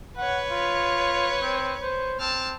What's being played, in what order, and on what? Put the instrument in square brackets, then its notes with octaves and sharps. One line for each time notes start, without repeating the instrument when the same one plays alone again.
[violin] B4 C#5 [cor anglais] F#5
[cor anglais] F4
C4
C5
[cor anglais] C4 [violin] A5 F6